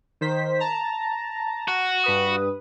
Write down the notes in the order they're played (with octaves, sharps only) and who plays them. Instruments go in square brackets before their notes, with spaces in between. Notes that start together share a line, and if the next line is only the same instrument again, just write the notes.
[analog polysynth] D#3 C5 B6
A5 A#5
[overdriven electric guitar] F#4
[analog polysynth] G2 B4 D#6